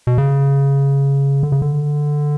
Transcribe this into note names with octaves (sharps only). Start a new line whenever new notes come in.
B2
C#3
D3
C#3
D3